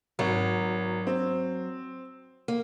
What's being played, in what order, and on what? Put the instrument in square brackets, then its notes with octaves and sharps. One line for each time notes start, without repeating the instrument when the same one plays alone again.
[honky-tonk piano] G#1 [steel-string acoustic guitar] F#3
[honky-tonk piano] C4
[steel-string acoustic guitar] A#3